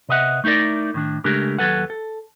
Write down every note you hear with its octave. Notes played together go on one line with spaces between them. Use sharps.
C3 B4 D#5 E5 F#5
A3 D#4 E4 A#4 D5
A2 D#3 D4
C#3 G#3 A3 D4 G4 A#4
D#2 F#3 A4 B4 F#5
A4